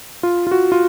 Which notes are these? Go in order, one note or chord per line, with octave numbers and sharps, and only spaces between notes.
F4
F4
F#4
F4